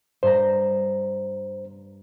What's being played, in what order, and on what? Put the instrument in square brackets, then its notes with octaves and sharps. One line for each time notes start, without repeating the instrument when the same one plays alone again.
[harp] G2 A#5 [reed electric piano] C5